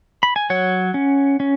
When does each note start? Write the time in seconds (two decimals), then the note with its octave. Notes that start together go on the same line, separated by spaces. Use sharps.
0.23 B5
0.36 G#5
0.50 F#3 C#5 F#5
0.94 C#4
1.40 C#4